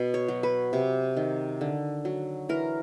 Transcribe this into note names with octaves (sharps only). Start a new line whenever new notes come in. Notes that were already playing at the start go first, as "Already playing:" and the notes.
Already playing: B2
C#5
F#3
B4
C3
D#3
D3
F#3
E3 A#4